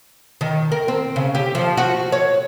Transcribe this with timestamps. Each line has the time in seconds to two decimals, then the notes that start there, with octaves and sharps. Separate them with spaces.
0.41 D#3
0.72 A#4
0.88 C4
1.16 C#3
1.35 G4
1.55 F3
1.77 F#4
2.12 C#5